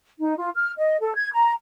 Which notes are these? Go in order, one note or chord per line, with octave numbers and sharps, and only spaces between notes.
D#4
F4
F6
D#5
A4
G#6
A#5